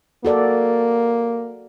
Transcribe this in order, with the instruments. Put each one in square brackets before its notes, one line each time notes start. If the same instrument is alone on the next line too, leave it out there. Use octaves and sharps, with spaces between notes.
[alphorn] A#3 [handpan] F#4 A4 D5